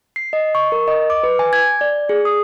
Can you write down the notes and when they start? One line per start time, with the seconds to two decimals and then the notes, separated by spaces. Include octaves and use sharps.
0.16 C7
0.33 D#5
0.55 C#6
0.72 A#4
0.88 D#5
1.10 D6
1.23 B4
1.39 G#5
1.53 G#6
1.81 D5
2.09 G#4
2.25 D#6